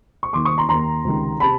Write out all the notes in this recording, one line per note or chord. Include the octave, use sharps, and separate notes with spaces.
C#6
D#2 D#3 C6 D6
C#6 D#6
A#5 C6
D#2 D#3 A#5 C6
C#2 C3 D#3
C3 A5 B5